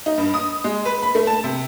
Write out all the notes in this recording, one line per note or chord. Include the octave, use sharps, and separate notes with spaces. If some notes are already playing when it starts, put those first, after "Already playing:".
D#4
G2
D#6
G#3
B4
B5
A3
A5
C3